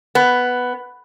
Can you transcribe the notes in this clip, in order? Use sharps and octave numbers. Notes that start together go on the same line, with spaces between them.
B3